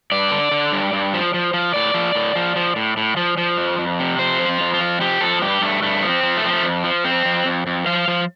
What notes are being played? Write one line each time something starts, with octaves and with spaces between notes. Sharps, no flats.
G2 D5
D3
D3
G2
G2
F3
F3
F3
A2 D5
F3
A2
F3
F3
A2
A2
F3
F3
F2
F2
C3
F2 C5
F3
F4
F2
F4
F3
F3 G4
F3 A4
G2 G4
G2 A3
G2 A3
F3
C4
F3
A3
F3 C4
A3
F2
F3
F2 C4
F2
F2
F2
F3 F5
F3